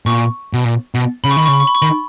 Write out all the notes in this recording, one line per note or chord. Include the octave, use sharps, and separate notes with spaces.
A#2 C#6
B2
A#2
B2
C#3 B5
C#6
D#3 B5
C#6
C#3
B5
C#6
B5
C#6
D#3 B5